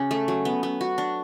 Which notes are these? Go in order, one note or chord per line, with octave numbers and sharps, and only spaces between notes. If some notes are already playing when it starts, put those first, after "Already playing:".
Already playing: C#3 C#4 F#4
A3
F#3
B3
B3
F#4
D4